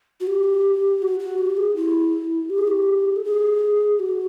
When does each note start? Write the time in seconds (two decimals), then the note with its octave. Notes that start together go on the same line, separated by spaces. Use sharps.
0.20 F#4
0.27 G4
1.02 F#4
1.19 F#4
1.38 G4
1.57 G#4
1.76 E4
2.50 G4
2.58 G#4
2.67 G4
3.16 A4
3.24 G#4
3.99 F#4